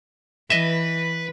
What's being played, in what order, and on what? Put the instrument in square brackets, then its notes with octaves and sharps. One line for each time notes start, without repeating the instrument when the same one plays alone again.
[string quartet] E3 [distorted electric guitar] B4 [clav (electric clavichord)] D#5 E5